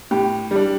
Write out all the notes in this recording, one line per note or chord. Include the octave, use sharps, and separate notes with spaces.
A2 G4
G3 D4